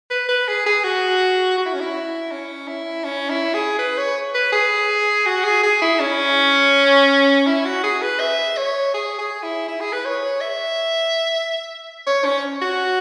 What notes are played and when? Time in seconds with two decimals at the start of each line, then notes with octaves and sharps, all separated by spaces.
0.11 B4
0.29 B4
0.48 G#4
0.66 G#4
0.84 F#4
1.58 F#4
1.66 E4
1.74 C#4
1.81 E4
2.31 C#4
2.68 E4
3.05 C#4
3.30 E4
3.54 G#4
3.79 B4
3.98 C#5
4.35 B4
4.52 G#4
5.26 F#4
5.44 G#4
5.63 G#4
5.82 E4
6.00 C#4
7.47 E4
7.65 F#4
7.84 G#4
8.02 B4
8.20 E5
8.57 C#5
8.94 G#4
9.19 G#4
9.43 E4
9.68 E4
9.81 G#4
9.93 B4
10.05 C#5
10.41 E5
12.07 C#5
12.25 C#4
12.62 F#4